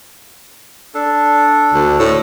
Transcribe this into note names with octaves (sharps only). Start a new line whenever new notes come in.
D4 A4
D2
A2 E6